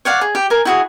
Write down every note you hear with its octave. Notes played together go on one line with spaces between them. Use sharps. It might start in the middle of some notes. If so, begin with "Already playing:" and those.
C#5 D5 F5 F#5
G#4
G4
A#4 G#5
E4 F#4 G#4